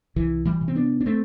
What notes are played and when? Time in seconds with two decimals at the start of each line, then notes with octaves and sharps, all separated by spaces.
0.16 C2 E3
0.45 E3 G3
0.61 C3
0.68 C4
0.75 B3 D4
1.01 D4
1.06 A3 C4